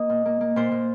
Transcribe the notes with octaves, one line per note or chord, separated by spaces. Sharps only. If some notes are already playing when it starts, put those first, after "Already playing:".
Already playing: A#3 D#5
A#2
A#3
A#3
A#2 C5
A#2